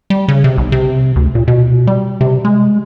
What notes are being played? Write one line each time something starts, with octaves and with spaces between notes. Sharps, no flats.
G3
C#3
C3
B1
C3
D2
A#2
B2
G3
C3
G#3